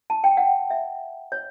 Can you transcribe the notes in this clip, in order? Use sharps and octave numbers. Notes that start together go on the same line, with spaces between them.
A5
G5
F#5
E5
C#5